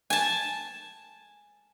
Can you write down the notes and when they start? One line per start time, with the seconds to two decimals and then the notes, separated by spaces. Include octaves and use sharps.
0.10 G#5 A5